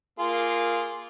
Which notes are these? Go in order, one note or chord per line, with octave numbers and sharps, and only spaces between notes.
A#3 F4 G#4